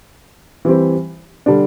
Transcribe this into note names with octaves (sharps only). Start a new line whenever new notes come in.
E3 G3 C4 G4
D3 G3 D4